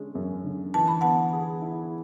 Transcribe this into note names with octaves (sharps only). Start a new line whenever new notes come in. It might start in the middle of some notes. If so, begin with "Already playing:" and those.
Already playing: D3 G#3 C#4
F#2
D3
E3 A5
B5
B3 F#5 A5
G#4
E4